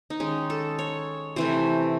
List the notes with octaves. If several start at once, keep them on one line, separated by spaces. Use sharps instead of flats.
D#4
D#3 G#3 C#4
A4
C#5
C3 E3 A3 C5